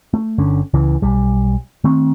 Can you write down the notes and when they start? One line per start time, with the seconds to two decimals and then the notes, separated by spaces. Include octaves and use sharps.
0.14 A3
0.38 G1 D3 C#4
0.74 C#2 C#3 E3
1.02 B1 G3
1.84 D#3 A3 C4